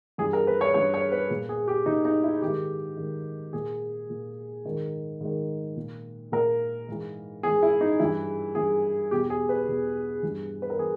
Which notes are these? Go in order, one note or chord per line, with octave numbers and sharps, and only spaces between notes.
G2 E3 G#4
A#4
B4
C#5
G2 E3 C#5
C#5
B4
A#2
G#4
G4
A#2 D#4
D#4
E4
G#2 D#3 G4
G#2 D#3
A#2 G#4
A#2
G#2 D#3
G#2 D#3
A#2
A#2 A#4
G#2 E3
G#2 E3 G#4
E4
D#4
G2 E3 E4
G2 E3 G#4
E2 B2 G4
G4
G#4
B4
E2 B2
G2 E3
B4
A#4
E3 G#4